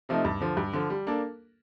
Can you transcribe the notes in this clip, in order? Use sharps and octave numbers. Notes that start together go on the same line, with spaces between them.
C3 F3 A3 D#4
G2
D3 F3
G2
D3 F3
G3
A#3 D4 A4